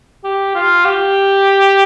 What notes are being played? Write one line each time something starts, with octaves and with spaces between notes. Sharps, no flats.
G4
F4
G4